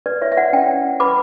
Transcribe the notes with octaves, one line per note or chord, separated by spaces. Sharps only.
B4 D5
E4 C#5 E5
E5
E4 D5 F#5
C#4 E5 G5
C#4
C#4
B4 B5 D6